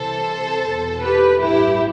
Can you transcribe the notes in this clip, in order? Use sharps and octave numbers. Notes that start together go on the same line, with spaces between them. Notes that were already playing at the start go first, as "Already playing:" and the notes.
Already playing: C2 C3 E3 A4 C5
E2 B2
G4 B4
A1 G2 E3 E4 G4